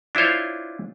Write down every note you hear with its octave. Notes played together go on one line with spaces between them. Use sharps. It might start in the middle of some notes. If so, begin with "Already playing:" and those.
D4 E4 F4 C5 C#5